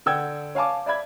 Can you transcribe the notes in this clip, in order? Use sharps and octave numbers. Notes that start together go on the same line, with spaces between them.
D3 F#5 G5 E6 G#6
C#5 F5 G#5 A5 D6
D5 E5 B5 G#6